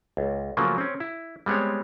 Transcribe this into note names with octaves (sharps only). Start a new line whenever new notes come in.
C#2
C#3 F3 F#3 A3 A#3
C4 C#4
E4
G3 G#3 B3 C4 C#5